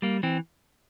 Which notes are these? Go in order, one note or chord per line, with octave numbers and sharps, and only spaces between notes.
G3 A#3
E3 C4